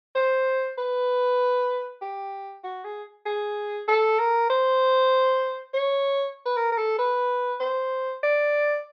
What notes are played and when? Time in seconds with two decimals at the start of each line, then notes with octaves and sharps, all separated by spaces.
0.16 C5
0.78 B4
2.02 G4
2.64 F#4
2.85 G#4
3.26 G#4
3.88 A4
4.19 A#4
4.50 C5
5.74 C#5
6.46 B4
6.57 A#4
6.72 A#4
6.78 A4
6.98 B4
7.60 C5
8.23 D5